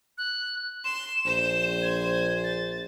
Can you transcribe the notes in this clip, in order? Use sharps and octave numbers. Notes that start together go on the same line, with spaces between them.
F#6
C6 E7
A#1 C5
G#6
A6